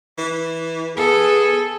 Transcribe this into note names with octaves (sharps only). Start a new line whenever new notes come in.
E3
B3 G#4 A4